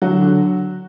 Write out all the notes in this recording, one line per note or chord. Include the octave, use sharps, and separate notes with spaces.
D3 F#3 F#4
D3